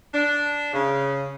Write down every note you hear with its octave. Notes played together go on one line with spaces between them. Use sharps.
D4
C#3